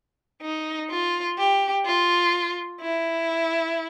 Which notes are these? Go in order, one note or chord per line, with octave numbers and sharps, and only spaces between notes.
D#4
F4
G4
F4
E4